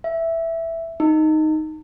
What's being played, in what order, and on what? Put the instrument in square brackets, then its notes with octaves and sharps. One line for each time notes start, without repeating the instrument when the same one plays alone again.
[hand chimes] E5
D#4